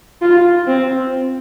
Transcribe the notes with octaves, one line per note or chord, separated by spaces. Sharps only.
F4
C4